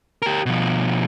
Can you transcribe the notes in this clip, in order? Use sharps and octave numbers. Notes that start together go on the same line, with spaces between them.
G4 A#4
B2 F3